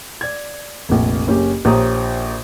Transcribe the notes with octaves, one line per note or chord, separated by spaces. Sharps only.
D5 G#6
F1 A#1
F#1 C#4 G4
A#1 G4 C5 C#5 A#5 D#6